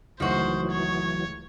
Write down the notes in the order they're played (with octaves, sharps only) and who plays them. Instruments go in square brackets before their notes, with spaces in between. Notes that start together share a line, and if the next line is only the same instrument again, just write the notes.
[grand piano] C#2 A3 [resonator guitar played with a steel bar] D#3 F#4 [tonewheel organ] E3 F#3 [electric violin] C5
[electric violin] C#5